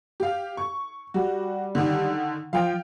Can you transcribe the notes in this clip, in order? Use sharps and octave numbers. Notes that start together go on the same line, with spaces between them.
G4 F5
C#6
G3 F#4
D3 D#3
F3 F5 G5